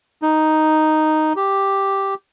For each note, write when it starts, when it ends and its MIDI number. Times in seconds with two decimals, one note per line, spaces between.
0.22 1.33 63
1.36 2.14 67